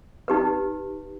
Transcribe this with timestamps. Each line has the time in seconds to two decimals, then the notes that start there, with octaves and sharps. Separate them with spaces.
0.28 D#4 G4 B4